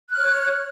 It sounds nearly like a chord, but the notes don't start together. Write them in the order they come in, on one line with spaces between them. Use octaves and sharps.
F#6 F6 C#5